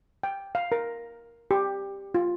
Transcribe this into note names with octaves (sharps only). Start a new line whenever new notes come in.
G5
F5
A#4
G4
F4